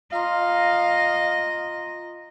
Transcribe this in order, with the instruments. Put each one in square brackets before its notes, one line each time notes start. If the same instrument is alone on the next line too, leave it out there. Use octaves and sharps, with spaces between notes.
[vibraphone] F4 A#5 C6 [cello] D#5 [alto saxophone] F5